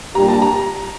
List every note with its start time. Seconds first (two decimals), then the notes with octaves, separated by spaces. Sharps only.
0.15 A#2 G3 D4 G4 A#5
0.28 A5
0.42 A#5